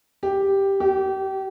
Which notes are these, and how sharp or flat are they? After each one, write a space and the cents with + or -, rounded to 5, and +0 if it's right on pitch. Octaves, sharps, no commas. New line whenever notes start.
G4 +0
G4 -30